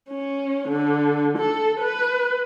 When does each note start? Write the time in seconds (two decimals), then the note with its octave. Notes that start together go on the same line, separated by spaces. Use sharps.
0.10 C#4
0.68 D3
1.38 A4
1.81 B4